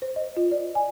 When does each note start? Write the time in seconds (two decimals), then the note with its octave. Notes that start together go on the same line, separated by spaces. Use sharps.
0.02 C5
0.16 D#5
0.37 F4
0.51 D5
0.75 G#5